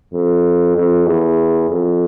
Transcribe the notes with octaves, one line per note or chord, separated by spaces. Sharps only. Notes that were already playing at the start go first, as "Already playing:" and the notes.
F2
F2
E2
F2